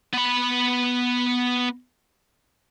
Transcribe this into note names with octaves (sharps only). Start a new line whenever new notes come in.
B3 B5